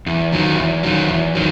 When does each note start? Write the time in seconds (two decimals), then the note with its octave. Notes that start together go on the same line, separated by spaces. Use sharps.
0.06 E2
0.32 D#3 F#3
0.58 E2
0.83 D#3 F#3
1.09 E2
1.35 D#3 F#3